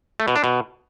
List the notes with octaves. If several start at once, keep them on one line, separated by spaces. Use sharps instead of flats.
A3
B2
D4
B2